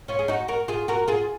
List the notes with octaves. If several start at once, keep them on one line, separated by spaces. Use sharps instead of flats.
C#4 F4
G#4
D#4 F#4
F#4 A#4
F4 G#4
F#4 A#4
F4 G#4